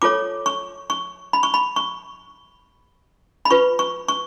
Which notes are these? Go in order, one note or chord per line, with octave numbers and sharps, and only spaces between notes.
F4 A4 C#5 D6
C#6
C#6
B5
C#6
B5
C#6
B5
F4 B4 C#6
C#6
C#6